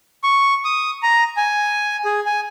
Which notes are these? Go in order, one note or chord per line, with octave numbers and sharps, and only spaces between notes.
C#6
D#6
A#5
G#5
G#4
G#5